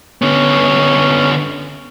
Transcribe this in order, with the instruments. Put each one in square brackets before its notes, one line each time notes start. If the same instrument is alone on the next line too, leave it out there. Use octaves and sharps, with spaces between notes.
[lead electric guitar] D3 B3 [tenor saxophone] C#4